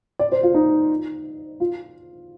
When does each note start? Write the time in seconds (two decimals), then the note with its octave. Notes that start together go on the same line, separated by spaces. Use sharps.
0.19 D5
0.32 C5
0.43 F4
0.54 D#4
1.60 F4